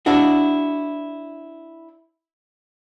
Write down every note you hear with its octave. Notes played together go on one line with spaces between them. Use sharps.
D4 E4 F#4